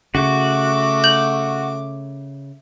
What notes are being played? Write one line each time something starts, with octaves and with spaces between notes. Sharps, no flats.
C#3 A3 F#4 D6
G6 F#7